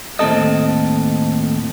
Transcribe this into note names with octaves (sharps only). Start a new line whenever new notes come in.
D#2 A2 C4 A4 D#5